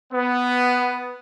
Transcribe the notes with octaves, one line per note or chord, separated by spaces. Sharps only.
B3